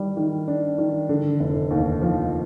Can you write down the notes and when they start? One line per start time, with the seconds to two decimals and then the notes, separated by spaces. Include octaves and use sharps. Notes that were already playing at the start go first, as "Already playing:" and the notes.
Already playing: D#3 G3
0.17 D#3
0.48 D4
0.78 D#3
1.09 D3
1.40 F1
1.71 D#2
2.01 F3